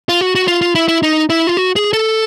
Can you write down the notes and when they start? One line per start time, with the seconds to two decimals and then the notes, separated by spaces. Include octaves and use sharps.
0.09 F4
0.21 F#4
0.35 F#4
0.48 F4
0.61 F4
0.75 E4
0.88 E4
1.03 D#4
1.30 E4
1.47 F4
1.57 F#4
1.76 G#4
1.93 A4